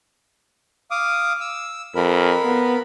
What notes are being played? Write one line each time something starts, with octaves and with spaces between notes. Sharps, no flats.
F5 D6 D#6
E6
F2 A#4 B5
B3